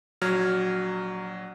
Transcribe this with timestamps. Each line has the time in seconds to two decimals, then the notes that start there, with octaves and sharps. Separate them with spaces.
0.21 A#1 F#3 F6 G#6